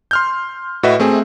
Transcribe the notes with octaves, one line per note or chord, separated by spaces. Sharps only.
C6 F6 G6
A2 F#4 B4 D#5 E5
A3 C4 G#4